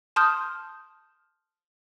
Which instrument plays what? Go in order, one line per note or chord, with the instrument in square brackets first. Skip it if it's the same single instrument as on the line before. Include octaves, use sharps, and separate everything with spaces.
[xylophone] A5 C6 D#6 F6 G6